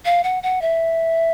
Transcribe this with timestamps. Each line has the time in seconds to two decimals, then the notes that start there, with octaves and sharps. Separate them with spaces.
0.05 F5
0.24 F#5
0.43 F#5
0.62 E5